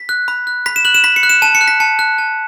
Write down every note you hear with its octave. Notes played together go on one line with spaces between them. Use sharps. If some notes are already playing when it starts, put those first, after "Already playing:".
Already playing: B6
F#6
B5
F#6
B5 B6
E7
F#6 F#7
E7
B5 B6
C#7
F#6
E7
A5 E7
C#7
F#6
B6
A5 C#7
F#6
A5